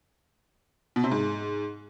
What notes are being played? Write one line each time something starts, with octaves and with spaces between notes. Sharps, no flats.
B2
C3
G#2